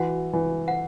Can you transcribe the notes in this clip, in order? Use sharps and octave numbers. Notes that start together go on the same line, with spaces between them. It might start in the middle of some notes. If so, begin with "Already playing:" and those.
Already playing: E3 F#4 F#5
E3
F#5